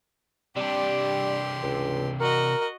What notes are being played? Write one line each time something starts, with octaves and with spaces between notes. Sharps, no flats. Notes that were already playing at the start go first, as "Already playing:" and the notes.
C3 G3 D4 G4 C6
C#2
F#4 A#4 D#5